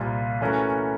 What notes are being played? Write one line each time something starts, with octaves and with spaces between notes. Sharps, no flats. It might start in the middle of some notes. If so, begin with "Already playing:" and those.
Already playing: C2 A#2 G3 C4 F4
E3 A3 C#4 F#4 A#4